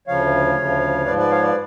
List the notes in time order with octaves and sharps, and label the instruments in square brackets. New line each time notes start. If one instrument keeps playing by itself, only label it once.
[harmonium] D2 C#3 F3 C#5 F5
D2 C#3 F3
G#2 F3 B4 D5
B4 D5
C#5 F5
B4 D5